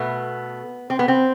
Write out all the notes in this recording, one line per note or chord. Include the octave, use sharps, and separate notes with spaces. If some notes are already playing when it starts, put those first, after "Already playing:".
Already playing: B2 A3 B3
C4
B3
C4